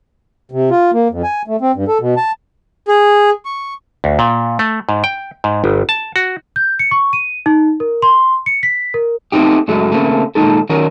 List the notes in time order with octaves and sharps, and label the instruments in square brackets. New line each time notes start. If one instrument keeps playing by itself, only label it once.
[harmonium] C3
F4
A#3
F2
G#5
A3
C4
G2
A4
B2
A5
[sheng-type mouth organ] G#4
C#6
[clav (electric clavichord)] D2
A#2
A3
G#2
G5
G#2
G1
A5
F#4
[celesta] G6
C#7
C#6
D#7
D#4
A#4
C6
C#7
B6
A#4
[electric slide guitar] A3 B3 C4 D#4 G4
F#2 G#3 A3 F#4 A4
C#3 A3 A#3 C4 C#4
A#2 D#3 G3 G#3 D#4 A4
D#3 F#3 C#4 A#4